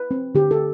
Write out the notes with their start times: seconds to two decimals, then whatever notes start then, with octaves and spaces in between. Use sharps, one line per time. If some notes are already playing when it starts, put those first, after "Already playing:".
Already playing: B4
0.11 C4
0.35 D3 G4
0.51 A4